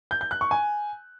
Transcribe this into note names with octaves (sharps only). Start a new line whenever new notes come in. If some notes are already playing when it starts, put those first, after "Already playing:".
G6
G6
F#6
C#6
G#5